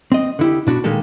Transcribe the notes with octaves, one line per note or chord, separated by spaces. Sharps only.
C4 D#5
D3 E4 G4
B2 D4 F#4 B5
A#2 D#3 G#3 A#3 G4 A4